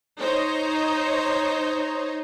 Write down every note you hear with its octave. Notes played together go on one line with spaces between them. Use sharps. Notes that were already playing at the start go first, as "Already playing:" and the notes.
D#4 C5 C#5